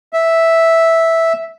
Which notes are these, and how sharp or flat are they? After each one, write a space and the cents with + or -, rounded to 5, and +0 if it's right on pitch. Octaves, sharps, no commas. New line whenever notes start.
E5 -5